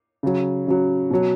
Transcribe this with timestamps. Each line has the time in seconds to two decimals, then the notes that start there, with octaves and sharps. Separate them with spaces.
0.23 C#3 F#3
0.68 C#3 F#3
1.10 B2 F#3